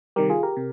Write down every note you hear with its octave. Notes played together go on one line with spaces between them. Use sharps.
C3 D#3 G3 G4 A#4
F4 G#4
G4 A#4
C3